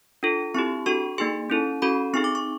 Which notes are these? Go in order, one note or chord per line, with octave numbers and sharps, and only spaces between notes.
D4 F4 A4
C4 E4 G4 C#6
D4 F#4 A4 C#6
A#3 D#4 G#4 C6
C#4 E4 A4
C#4 F#4 A4 B5
C4 D#4 G#4 C#6
D6
C#6